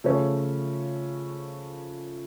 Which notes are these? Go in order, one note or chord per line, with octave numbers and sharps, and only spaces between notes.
C#3 F3 A3 C#4